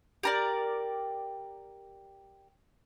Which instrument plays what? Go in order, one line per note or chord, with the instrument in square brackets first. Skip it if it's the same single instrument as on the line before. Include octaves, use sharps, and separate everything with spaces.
[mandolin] G4 A#4 D5